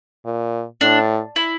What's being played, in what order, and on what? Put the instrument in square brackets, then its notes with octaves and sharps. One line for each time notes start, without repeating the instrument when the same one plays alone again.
[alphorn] A#2
[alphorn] A2 [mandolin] D4
[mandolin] E4